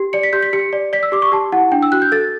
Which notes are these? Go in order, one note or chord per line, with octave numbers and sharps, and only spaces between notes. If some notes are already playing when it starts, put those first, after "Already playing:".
Already playing: G4
D5 C#7
B6
G4 G6
B6
G4 C#7
D5
D5 B6
E6
G4 D6
C#6
G4 A5
E4 F#5
D4 G5
E6
F#4 F#6
G6
A4 A6